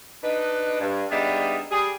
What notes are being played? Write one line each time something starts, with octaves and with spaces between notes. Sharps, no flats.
D4 D#4 B4
G2
G3 B3 D4 D#4 G#4 E5
G3 G#4